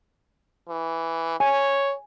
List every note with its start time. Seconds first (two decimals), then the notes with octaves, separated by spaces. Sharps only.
0.69 E3
1.40 C#5 G#5